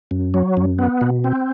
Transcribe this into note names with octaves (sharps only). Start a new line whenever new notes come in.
F#2
F#3
F#2
B3
B2
C4